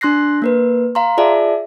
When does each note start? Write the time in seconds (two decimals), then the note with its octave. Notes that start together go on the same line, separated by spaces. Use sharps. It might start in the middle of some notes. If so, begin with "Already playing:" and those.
0.01 D4 C6 F#6 A#6 C7
0.42 A#3 A#4 B4
0.95 F5 A#5 C6
1.18 F4 G#4 D5 E5 A5